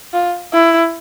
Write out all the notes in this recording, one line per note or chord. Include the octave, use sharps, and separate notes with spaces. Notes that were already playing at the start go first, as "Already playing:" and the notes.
F4
E4